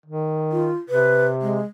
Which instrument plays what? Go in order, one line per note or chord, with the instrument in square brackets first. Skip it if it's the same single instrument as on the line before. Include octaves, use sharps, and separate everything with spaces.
[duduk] D#3
[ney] F4
[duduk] C3 [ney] B4
[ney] G#3